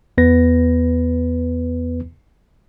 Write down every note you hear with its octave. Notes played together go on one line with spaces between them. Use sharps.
E2 B3 B4 A#6